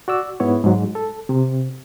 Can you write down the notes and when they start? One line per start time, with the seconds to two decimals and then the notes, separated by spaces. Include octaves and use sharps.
0.08 F#4 D5 E6
0.40 G#2 B3 E4 C#5
0.63 G#2 F#3
0.95 A4
1.29 C3